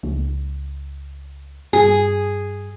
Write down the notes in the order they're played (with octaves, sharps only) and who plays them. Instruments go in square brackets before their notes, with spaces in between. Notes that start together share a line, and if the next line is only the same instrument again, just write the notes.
[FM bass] C#2
[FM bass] G2 [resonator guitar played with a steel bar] G#4